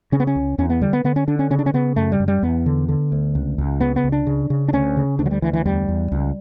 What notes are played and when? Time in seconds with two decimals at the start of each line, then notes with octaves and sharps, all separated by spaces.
0.12 C#3 C#4
0.20 B3
0.27 C#4
0.36 C#2
0.58 E2 C#4
0.70 B3
0.82 D3 G3
0.93 B3
1.04 D3 B3
1.16 C#4
1.27 D3 D4
1.39 C#4
1.50 C#3 C#4
1.59 D4
1.66 C#4
1.74 C#3 B3
1.96 F#2 A3
2.12 G3
2.20 F#2
2.28 G3
2.43 E2 B3
2.66 D3
2.89 D3
3.12 D2
3.35 C#2
3.58 C#2
3.81 C#3 B3
3.96 B3
4.04 C#2
4.12 D4
4.27 C#3
4.50 C#3
4.68 D4
4.73 D2 C#4
4.97 C#3
5.19 D2 D4
5.26 F#3
5.31 G3
5.42 D2 E3
5.53 E3
5.65 E2 G3
5.88 E2
6.12 C#2